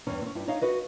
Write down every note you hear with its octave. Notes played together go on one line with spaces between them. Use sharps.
E2 G2 E3 C#4
C4 C#4
G2 E4
D#4 C#5 D#5 F5
F#4 B4 D#5